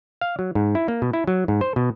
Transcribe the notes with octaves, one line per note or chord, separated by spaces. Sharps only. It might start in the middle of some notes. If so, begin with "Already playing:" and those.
F5
F#3
G#2
E4
A#3
B2
E4
F#3
G#2
C5
B2